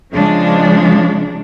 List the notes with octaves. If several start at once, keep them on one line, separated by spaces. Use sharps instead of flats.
C#3 F3 G#3 D4